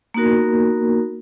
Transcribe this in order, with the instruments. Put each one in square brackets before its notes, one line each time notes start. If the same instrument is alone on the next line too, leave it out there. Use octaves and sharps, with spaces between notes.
[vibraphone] A#3 B3 D#4 F#4 A#4